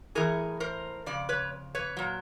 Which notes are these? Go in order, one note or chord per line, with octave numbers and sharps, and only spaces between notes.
A2 E3 G#4 A#4
A#4 C5
F2 C#3 D5
B4 C#5
B4 C#5
A#2 F#3